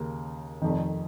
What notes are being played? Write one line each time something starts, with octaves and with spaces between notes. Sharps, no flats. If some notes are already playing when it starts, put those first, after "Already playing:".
Already playing: D#2 C#3 A#3
F1 F2 D#3